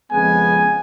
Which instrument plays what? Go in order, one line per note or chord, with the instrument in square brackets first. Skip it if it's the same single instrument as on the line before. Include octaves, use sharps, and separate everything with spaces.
[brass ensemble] F2 C#3 G#3 B3 G#5